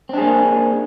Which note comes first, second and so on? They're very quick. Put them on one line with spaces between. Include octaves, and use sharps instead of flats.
C4 D4 G#4 A#3